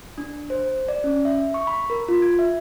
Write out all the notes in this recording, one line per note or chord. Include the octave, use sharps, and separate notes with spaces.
D4
C5
D5
C#4
E5
C#6
B5
A#4
F4
G#6
E5